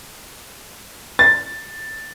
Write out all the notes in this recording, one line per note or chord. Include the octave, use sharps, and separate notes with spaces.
A6